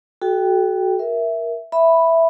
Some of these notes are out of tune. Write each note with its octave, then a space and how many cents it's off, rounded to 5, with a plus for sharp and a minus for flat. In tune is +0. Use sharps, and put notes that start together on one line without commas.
F#4 +10 A4 -40 G5 +0
A#4 +15 E5 +0
E5 +0 B5 +0